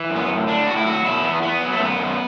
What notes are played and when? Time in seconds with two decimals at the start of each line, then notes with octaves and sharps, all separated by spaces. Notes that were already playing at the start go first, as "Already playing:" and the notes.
Already playing: E3
0.10 F#2
0.16 B3
0.28 A2
0.47 A2 D4
0.67 A2 F#4
0.77 E4
0.85 F#3 F#4
1.04 B2 E4
1.23 E2 B3
1.42 E2 B3
1.61 F#3
1.72 A3
1.80 F#2 B3
1.99 F#2